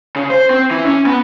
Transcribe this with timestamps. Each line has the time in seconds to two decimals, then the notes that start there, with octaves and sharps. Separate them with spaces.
0.16 C#3
0.30 C5
0.50 C4
0.71 E3
0.85 C#4
1.06 B3